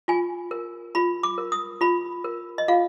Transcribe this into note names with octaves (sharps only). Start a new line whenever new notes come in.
F4 G#5
A#4
F4 B5
D6
A#4
D#6
F4 B5
A#4
D#5
F4 F5